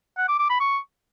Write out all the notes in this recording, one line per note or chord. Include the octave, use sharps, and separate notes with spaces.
F#5
D6
D6
B5
C#6